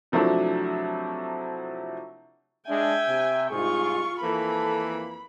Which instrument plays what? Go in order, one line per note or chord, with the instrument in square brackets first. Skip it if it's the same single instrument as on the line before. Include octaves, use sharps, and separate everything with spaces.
[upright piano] C3 F3 F#3 A3 D4 E4
[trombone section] G#3 D4 [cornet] E5 [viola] G5 G#5
[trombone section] C3
[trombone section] C2 G#2 [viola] F4 C#6 [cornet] G#4
[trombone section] F2 E3 A#3 [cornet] A4 [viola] B5